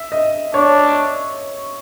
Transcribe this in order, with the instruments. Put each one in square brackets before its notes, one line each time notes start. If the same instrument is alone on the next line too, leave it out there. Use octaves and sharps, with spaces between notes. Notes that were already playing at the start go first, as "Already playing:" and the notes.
Already playing: [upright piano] E5
D#5
[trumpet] D4 [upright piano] C#5